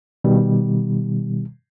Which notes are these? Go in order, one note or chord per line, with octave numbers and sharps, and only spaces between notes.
B2 D#3 G3